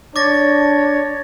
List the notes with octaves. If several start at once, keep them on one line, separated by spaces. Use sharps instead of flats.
D4 C#5 D6 A6 A#6